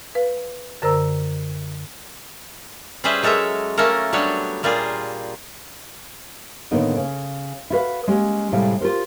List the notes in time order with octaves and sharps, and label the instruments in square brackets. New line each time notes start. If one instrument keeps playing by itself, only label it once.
[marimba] B4 F5
F#2 D3 A#4 C5 A#5 E6
[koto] G3 C#4 G#4 B4 C5 E5
F#3 G#3 A4 A#4 C#5 E5
A3 A#3 C#4 A4 A#4
F#3 G3 B3 D4 C#5
A#2 G3 A#3 F4 G#4
[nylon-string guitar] A2 D3 D#3 A#3 B3 D#4
C#3
E4 F#4 B4 F5
G#3 A#3 C#4 G4
A2 C3 G3 G#3 F5 G5
F4 G4 A#4 C5